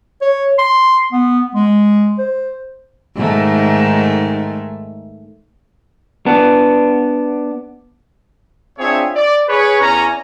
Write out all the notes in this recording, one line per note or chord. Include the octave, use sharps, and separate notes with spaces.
C#5
C6
B3
G#3
C5
G#2 D#3 A3
B3 D4
C4 D4 F4 G#4 C#5 E5
D5
G#4 B4 C#5
E2 C#4 A#5